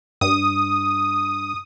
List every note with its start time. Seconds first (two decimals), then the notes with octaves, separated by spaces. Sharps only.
0.21 G2 D#6